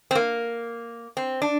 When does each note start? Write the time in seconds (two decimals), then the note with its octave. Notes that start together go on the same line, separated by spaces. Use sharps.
0.11 C4
0.15 A#3
1.17 C4
1.42 D4